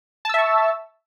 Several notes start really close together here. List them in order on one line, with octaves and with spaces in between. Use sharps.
A5 E6 E5 C#6